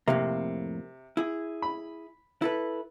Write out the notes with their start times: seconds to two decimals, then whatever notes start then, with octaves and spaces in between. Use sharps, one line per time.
0.08 F2 A2 C3 A#3
1.17 E4 G#4
1.62 B5
2.42 E4 A4 B4